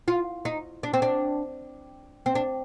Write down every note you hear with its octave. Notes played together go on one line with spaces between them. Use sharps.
F4
D#4
D4
C4
D4
C4
D4